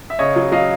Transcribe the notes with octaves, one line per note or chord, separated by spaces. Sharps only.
E5
C#3 C#5 D#5
F#3
F#3 D#5 F5